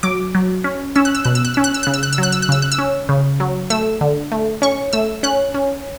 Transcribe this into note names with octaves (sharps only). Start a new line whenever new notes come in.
F#3 D6
F#3
C#4
C#4 E6
F#6
E6
B2 F#6
E6
F#6
C#4 E6
F#6
E6
C#3 F#6
E6
F#6
E6
F#3 F#6
E6
F#6
C#3 E6
F#6
E6
C#4
C#3
F#3
A3 E6
D3
A3
C#4 C#6
A3 E6
C#4 F#6
C#4